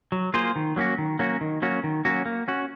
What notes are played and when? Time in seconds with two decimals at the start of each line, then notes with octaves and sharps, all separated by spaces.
0.12 F#3
0.34 A#3 F4 G#4 C5
0.56 D#3
0.76 F#3 A#3 C#4 F#4
0.98 D#3
1.19 F#3 A#3 C#4 F#4
1.41 D#3
1.62 F#3 A#3 C#4 F#4
1.84 D#3
2.05 F#3 A#3 C#4 F#4
2.26 A#3
2.48 C#4 F#4